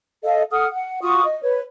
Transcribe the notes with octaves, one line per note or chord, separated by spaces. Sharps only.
A4 D#5 F5
A4 F#5 D#6 F6
F#5
F4 F#4 C#6 D#6
D#5
B4 C#5